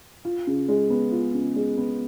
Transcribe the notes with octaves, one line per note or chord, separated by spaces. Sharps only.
F4
C#3
G#3
B3
F4
C#3
G#3
B3